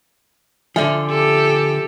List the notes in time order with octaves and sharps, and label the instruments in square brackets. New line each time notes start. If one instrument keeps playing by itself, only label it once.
[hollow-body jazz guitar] D3 F3 [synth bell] E5 G#5
[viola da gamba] G4 A4